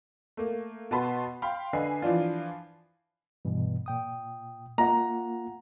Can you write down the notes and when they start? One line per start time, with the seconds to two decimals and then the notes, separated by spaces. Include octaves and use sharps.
0.37 A3 A#3
0.91 B2 B3 A5 B5 C6
1.42 F5 G5 B5 C6
1.73 D3 B4 D#5 G#5 C7
2.02 E3 F3 D4 F4
3.45 G2 B2 E3
3.86 A#2 G5 D#6
4.78 A#3 F4 F#5 A#5